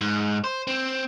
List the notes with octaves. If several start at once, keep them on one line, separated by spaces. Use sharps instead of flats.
G#2
C5
C4